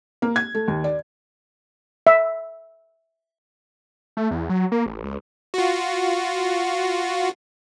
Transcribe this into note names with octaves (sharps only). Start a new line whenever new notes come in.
A#3
G#6
A3
D#2
D5
E5
A3
E2
F#3
A#3
A1
C#2
F4 F#4